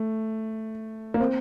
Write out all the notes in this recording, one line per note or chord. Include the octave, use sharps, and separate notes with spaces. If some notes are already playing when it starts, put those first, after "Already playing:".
Already playing: A3
A#3
C4